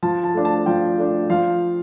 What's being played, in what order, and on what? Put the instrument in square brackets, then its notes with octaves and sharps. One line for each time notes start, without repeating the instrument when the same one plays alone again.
[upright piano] F3 A5
A5
A3 D4
A5
F3 G5
A3 D4
F3 F5